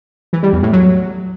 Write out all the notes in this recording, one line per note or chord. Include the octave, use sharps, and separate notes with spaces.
E3
G3
E2
A2
F#3